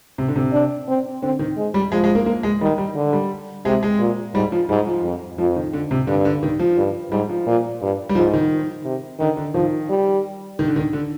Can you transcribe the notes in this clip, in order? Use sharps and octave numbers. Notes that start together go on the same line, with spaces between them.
C3
D3
C3
D4
C4
D3 C4
D#3
G#3
G3
F3 G#3
G#3
A#3
A#3
G#3
D#3 G3
G3
D3
G3
C3 G#3
G#3
A#2
G#2 G3
F3
G#2 G3
F3
F2
F2 F3
D#3
D3
C3
G2 D3
D3
D#3
F3
G2
G#2 G3
F3
A#2
G2
G3
G#2 F3
D#3
C3
D3 D#3
D3
D#3 F3
G3
D#3
D3
D#3
D3